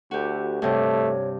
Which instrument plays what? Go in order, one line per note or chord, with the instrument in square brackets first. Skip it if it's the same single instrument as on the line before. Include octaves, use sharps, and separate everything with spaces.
[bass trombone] D2 [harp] F#4 G4 [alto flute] A4
[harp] G2 C3 [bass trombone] A3 [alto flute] C#5